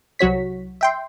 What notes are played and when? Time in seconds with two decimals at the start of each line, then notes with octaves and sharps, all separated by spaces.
0.19 C2 F#3 F#4 C#5 B6
0.81 E5 G5 C6